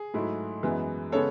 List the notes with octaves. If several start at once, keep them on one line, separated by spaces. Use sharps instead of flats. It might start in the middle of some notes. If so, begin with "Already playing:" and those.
Already playing: G#4
G#2 F#3 A3 E4
F#2 E3 G#3 B3
C#3 G#3 B3 A4 C#5